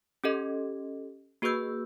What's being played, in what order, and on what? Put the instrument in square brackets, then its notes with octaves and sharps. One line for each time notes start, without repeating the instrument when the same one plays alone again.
[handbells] C#4 G4 A4 D#5
A#3 F#4 G#4 B4 E6 G6